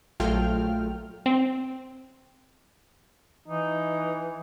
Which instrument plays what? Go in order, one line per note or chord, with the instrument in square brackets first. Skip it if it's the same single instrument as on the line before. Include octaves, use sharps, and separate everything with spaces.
[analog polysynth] A#1 F#3 A3 F4 G5 F6
[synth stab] C4
[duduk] E3 [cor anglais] D#4